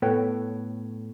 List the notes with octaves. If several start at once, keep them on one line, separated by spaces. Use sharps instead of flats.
A2 B3 A4 B4 C#5 G5